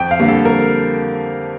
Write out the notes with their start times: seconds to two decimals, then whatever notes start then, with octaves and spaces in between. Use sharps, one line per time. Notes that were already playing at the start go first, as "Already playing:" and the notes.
Already playing: F2 G5
0.11 F5
0.19 D3 G3 A#3
0.28 A4
0.45 F2 A#4